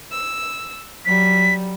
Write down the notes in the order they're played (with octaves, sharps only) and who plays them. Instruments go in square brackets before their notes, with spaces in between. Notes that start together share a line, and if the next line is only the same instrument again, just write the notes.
[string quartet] E6
[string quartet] F#3 G3 [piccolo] B6